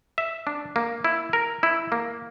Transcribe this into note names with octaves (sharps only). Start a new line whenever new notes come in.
E5
D4
A#3
E4
A#4
E4
A#3